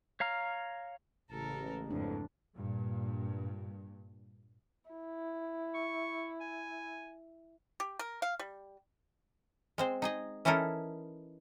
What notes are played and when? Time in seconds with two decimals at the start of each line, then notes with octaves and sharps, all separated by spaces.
0.20 C#5 F5 A#5 F6
1.31 A1 C#3 E3 G#3 A4 A#4
1.90 F2 G#2 D4
2.56 G2 A#2
4.90 E4
5.74 C#6
6.40 G#5
7.80 G4
7.99 A#4
8.22 F5
8.39 G3
9.78 G#3 C4 C5
10.02 D#4 G#4 D#5
10.45 E3 C#4 D#4 E4 A4 A#4